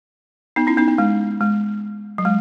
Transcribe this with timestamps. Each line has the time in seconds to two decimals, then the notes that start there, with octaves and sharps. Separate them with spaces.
0.56 B3 D#4
0.67 C#4 E4
0.77 B3 D#4
0.88 B3
0.98 G#3
1.41 G#3
2.18 F#3
2.25 G#3